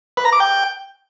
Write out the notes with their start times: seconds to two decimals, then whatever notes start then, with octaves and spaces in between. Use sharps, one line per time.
0.17 B4
0.25 A#5
0.33 D6
0.40 G5